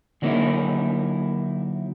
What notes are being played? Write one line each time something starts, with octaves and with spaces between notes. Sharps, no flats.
D3 F#3 A#3 D#4 E4